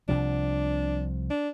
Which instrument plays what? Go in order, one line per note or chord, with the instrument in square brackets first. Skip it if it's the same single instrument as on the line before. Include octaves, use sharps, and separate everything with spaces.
[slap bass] C2 C3 F3 [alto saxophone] D4
[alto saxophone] D4